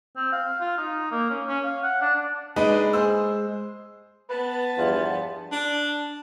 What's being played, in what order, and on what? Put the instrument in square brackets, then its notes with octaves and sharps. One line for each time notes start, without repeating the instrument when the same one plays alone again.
[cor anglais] C4
F5
F4
D#4
A#3
C#4
C#4
F5
F#5
D4
[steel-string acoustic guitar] G#3 [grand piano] D4 D#4 B4
[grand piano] G#4 C5 E6
[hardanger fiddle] B3 A5 [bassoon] B4
[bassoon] E2 [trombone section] G2 F3 F4
[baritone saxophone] D4